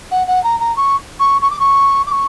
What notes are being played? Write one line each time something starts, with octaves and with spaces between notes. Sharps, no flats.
F#5
F#5
A#5
A#5
C#6
C#6
C#6
D6
C#6
D6
C#6